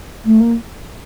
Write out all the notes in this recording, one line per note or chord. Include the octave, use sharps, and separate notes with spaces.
A3
A#3